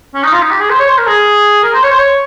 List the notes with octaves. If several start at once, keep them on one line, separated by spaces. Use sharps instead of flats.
C#4
D#4
F4
D#4
G4
G#4
C5
C#5
C5
A#4
G#4
A#4
C5
C#5
C5
C#5